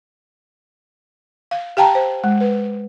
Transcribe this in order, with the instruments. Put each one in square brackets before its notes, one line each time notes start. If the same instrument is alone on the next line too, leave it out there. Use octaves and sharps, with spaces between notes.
[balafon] F5
G4 F5 G5 A5 A#5
C5
G#3
B4